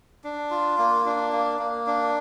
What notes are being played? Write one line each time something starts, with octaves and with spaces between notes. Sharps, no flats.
D4
F4
A#3
D4
A#3
A#3
D4